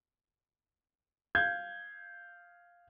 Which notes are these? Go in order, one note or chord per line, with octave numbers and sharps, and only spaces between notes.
F5 G6 G#6